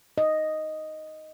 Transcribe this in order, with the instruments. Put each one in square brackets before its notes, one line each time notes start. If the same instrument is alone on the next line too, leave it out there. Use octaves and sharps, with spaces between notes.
[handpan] D#5